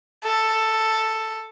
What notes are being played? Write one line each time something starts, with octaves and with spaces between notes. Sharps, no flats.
A4